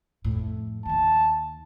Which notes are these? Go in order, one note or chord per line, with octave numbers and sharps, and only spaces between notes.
F2 A2
D#2 D#3 A5